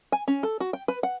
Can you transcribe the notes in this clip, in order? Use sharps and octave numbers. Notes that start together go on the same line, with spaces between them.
G#5
C#4
A4
F#4
G5
B4
F#5